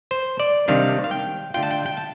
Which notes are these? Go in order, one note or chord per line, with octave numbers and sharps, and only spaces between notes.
C5
D5
C3 D#3 G3 D4 F5
F5
G5
D3 A3 D4 F4 G5
A5
G5
G5
A5